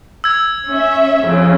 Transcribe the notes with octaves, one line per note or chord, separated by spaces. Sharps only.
E6 G#6
C#4 E5
F2 C#3